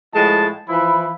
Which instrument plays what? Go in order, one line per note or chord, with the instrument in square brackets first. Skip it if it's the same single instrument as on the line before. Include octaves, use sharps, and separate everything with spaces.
[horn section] A2 F3 G#3 D#5 A5
E3 F3 E4 B5